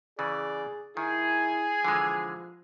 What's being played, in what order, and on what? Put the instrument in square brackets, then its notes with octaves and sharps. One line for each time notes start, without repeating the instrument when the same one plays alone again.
[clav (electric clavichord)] C#3 E3 [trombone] G#4 [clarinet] D5
[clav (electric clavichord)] D#3 [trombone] E4 [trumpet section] G#4 [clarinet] G#5
[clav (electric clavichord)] D3 E3 G#3 [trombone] F3